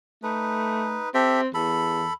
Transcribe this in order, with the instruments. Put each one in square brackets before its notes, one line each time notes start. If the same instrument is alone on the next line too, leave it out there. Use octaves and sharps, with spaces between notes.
[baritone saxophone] A3 [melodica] D#4 B4
[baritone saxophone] C4 [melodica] G4 A4 E5
[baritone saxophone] E2 [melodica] A4 B5